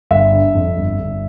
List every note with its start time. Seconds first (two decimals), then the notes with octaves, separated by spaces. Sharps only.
0.11 G1 E5
0.33 D3
0.55 F2
0.77 G1
1.00 G1